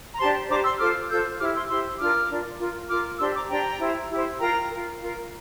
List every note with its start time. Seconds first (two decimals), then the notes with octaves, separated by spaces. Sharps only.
0.14 A#5
0.18 D4 G4 C5 A5 C6
0.49 D4 G4 C5 A#5 D6
0.63 C6 E6
0.79 F4 A4 C5 D6 F6
1.09 F4 A4 C5 E6 G6
1.39 E4 G4 C5 D6 F6
1.54 C6 E6
1.69 E4 G4 C5 C6 E6
1.99 D4 F4 A#4 D6 F6
2.29 D4 F4 A#4
2.59 F4 A#4
2.89 F4 A#4 D6 F6
3.19 D4 G4 C5 C6 E6
3.34 A#5 D6
3.49 D4 G4 C5 G5 A#5
3.79 E4 G4 C5
4.10 E4 G4 C5
4.39 F4 A#4 G5 A#5
4.69 F4 A#4
5.00 F4 A#4